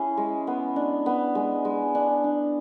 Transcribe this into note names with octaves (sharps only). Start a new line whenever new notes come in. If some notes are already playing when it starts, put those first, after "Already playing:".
Already playing: C#4 E4 G#4
G#3
B3
D4
B3
G#3
G#3
D4
D4